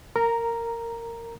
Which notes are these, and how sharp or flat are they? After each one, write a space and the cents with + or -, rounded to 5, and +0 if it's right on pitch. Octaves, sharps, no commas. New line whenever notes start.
A#4 -15 A#5 +0